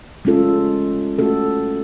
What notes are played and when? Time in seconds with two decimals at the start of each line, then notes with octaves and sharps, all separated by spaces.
0.25 G#3 C#4 F4 A4
1.19 A3 C#4 F#4 A4